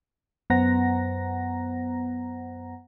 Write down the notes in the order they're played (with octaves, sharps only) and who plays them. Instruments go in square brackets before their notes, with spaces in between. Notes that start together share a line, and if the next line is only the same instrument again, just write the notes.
[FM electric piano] F#2 B3 C5 F#5 A#5 A#6